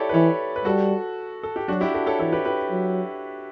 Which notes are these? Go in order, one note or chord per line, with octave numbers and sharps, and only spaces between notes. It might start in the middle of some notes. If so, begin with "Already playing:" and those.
Already playing: E4 G4 A4 C#5 D5
B4
E3 A4 C#5
B4
G3 F#4 A4
A4
G4
F#3 D4 F#4
E4 G4
F#4 A4
A4 C#5
E3 A4 C#5
G4 B4
G4 B4
F#3